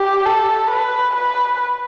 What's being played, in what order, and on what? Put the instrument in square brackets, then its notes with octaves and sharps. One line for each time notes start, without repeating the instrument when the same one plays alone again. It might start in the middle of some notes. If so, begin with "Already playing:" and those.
Already playing: [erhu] G4
A4
B4
B4